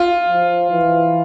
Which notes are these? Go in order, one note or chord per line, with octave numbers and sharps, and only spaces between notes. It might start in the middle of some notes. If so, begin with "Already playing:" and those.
Already playing: F4
F3
E3